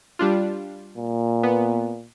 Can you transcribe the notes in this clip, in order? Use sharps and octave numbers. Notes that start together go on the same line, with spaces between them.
G3 D4 F4
A#2
B3